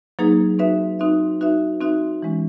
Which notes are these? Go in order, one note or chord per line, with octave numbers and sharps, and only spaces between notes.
F#3 A#3 D#4 G#4 B4
C4 D#4 F#4 B4 E5
C4 D#4 F#4 B4 E5
C4 D#4 F#4 B4 E5
C4 D#4 F#4 B4 E5
E3 G#3 C#4